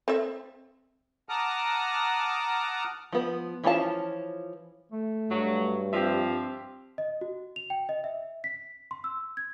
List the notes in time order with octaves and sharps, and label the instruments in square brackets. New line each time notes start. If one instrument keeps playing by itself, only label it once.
[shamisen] C4 A4 E5
[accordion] F#5 A5 A#5 D6 D#6 F6
[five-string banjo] F3 B3
E3 F3 C#4 F4 A5
[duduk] A3
[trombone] G2 [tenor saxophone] F#3
[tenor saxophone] F3 [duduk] C4 [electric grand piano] G4 E5
[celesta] D#5
F#4
F7
G5
D#5
E5
B6
C6
E6
G#6